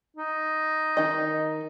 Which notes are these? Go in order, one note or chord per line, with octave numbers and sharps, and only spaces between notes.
D#4
D#3 D#5